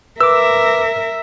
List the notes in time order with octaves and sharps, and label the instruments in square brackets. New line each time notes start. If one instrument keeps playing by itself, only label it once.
[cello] A#4 E5 [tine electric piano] B4 D6 [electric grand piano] E6